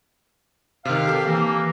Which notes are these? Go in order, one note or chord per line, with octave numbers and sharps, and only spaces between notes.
C3 D#3 F5
G4 A4
E3 A#3